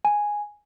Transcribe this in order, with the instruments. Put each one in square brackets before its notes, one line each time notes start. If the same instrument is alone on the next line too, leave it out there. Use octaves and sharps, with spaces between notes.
[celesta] G#5